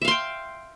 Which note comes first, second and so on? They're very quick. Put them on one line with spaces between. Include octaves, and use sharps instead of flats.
E5 F5 C6 G5